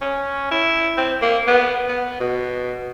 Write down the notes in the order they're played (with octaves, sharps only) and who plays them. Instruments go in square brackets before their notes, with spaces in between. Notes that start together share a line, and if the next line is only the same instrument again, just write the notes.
[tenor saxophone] C#4
E4
C4
A#3
B3
B3
B2